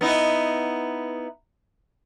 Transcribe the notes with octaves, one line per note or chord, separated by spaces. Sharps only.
B3 D#4 E4